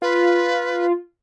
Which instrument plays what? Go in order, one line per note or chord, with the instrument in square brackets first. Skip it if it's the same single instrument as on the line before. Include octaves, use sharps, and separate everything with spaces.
[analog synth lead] F4 [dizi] B4